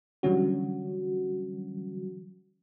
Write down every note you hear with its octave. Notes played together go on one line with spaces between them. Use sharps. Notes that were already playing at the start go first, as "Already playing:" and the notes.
D3 E3 F#3 G3 C#4 F#4